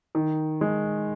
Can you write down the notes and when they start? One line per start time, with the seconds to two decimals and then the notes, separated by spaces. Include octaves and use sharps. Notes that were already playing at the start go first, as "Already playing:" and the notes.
0.15 D#3
0.61 G#3